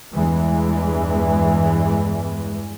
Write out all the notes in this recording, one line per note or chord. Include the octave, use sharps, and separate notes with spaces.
E2 G2 E3 G#3